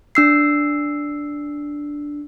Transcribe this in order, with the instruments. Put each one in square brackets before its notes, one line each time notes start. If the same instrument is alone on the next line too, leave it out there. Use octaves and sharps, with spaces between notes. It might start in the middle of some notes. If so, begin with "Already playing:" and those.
[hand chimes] D4 E6 C7